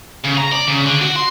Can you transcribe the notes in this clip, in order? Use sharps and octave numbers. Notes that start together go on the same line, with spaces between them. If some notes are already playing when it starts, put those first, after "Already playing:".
C#3
A#5
D5
C#3
D3
F#4
C6